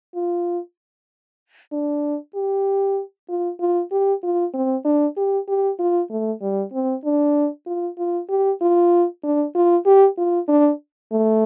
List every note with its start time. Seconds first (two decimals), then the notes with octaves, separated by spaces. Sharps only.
0.15 F4
1.72 D4
2.35 G4
3.29 F4
3.60 F4
3.91 G4
4.23 F4
4.53 C4
4.85 D4
5.17 G4
5.48 G4
5.79 F4
6.10 A3
6.41 G3
6.73 C4
7.05 D4
7.66 F4
7.98 F4
8.29 G4
8.61 F4
9.23 D4
9.55 F4
9.85 G4
10.18 F4
10.48 D4
11.11 A3